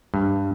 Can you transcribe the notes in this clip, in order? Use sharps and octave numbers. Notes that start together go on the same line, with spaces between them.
G2